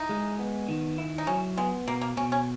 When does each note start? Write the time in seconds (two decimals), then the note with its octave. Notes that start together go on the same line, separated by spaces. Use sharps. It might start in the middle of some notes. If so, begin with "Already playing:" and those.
Already playing: D#4 E4
0.09 G#3
0.39 B3
0.68 D#3
0.98 E4
1.18 D#4
1.27 F#3 C#4
1.57 G#3 B3
1.87 B2 A#3
2.01 A#3
2.17 B2 C#4
2.32 C#4